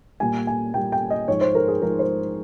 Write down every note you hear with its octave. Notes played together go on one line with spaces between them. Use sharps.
A#2 G3 G#5
G#5
A#2 G3 G5
G5
D#5
G#2 F3 C#5
C5
A#4
G#4
G#2 F3 A#4
C5